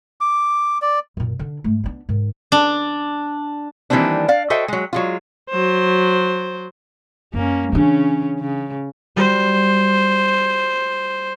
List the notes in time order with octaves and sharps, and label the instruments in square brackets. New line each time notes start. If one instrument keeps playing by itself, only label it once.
[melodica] D6
D5
[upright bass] F#2 A#2
D3 D4
G#2 A3
B3 D4
G#2 D#3
[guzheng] D4
[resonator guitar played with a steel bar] D#3 E3 G3 A#3 C4 D4
D5 F5
F#4 A4 C5 D#5 E5 G5
F#3 G#3
F#3 G#3 F4
[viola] F#3 C5
[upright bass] F#2 [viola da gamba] A#3 C#4
[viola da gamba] C#3 C#4 [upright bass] E3 D4
[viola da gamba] C#3
[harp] G3 F#4 [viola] C5